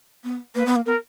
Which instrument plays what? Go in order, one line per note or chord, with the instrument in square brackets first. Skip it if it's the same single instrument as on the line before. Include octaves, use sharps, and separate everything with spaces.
[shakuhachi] B3
[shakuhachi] A#3 [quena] B4
[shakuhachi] B3
A#3
[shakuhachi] B3 [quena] A#4